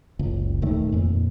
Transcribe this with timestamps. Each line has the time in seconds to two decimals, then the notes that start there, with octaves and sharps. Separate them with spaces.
0.19 F#1 C#2
0.62 D#1 D#3 A3
0.92 F2 A#2